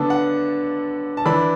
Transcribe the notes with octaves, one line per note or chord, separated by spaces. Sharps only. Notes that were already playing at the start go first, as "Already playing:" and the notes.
Already playing: D3 B3 D4 A5
F#5
A5
E3 D4 B5